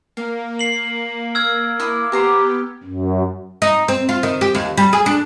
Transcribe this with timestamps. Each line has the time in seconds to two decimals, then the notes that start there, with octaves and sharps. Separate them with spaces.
0.17 A#3 F5
0.59 C7 F#7
1.35 E6 F6 G#6
1.80 E4 D5 D#6
2.12 B3 G4 C5 A#5 D6
2.83 F#2
3.62 D#4
3.88 C4
4.09 F4
4.23 D#3
4.41 G4
4.55 D#2
4.77 G3
4.93 G#4
5.06 D4